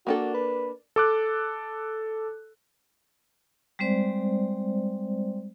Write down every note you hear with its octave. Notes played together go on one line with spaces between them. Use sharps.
A#3 D4 F#4 A4
B4
A4 D6 F#6
G3 G#3 C4 C5 D5